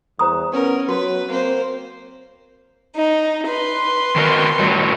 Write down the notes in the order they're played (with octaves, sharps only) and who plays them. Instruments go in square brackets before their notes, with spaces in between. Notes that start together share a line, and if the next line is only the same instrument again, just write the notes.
[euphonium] E2 [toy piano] C5 A#5 D#6
[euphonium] B3 [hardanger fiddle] C#4 A#4
[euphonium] F#3 [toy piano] F#4 [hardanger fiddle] B4
[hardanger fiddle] A#3 C5 [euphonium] C4
[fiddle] D#4
B4 C6
[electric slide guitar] D#3 F#4 A#4
A2 G3 F#4